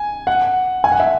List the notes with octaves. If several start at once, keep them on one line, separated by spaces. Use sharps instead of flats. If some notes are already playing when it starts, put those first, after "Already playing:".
Already playing: G#5
F#5
G#5
F#5
E5